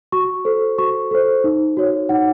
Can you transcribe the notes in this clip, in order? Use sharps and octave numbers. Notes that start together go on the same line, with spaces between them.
F#4 C#6
A4 C5
F#4 C#6
A4 C5
D#4
F#4 C#5
D#4 F#5